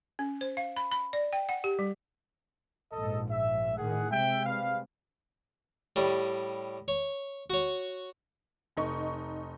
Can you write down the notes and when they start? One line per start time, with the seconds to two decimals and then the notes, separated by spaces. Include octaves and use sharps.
0.19 C#4
0.41 C5
0.57 F5
0.76 B5
0.91 B5
1.13 D5
1.33 G5
1.49 F#5
1.64 G4
1.79 G3
2.92 A#1 G#2 A4 D#5
3.30 E5
3.76 A2 D#3 G#4 F#5
4.11 C3 G#3 E5 G5
4.45 G3 B4 F5
5.96 A2 G3
6.88 C#5
7.50 F#4 C#5
8.77 F1 D#4 C#6